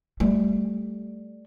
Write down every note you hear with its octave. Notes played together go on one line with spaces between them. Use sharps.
G3 A3